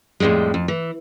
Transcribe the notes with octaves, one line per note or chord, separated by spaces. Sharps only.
F2 A2 D3 G3 G#3
F2
E3